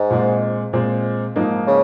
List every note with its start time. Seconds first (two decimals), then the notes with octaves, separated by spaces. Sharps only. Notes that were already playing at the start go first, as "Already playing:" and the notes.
Already playing: G#2
0.10 A#2 G#3 C4
0.73 A#2 G#3 C4
1.36 G#2 F3 A#3 D#4
1.67 C#3